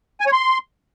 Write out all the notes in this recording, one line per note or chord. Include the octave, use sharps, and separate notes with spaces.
G#5
C#5
C6